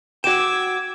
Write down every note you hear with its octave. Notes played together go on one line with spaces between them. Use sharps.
F#4 G5 D6 E6 G#6 E7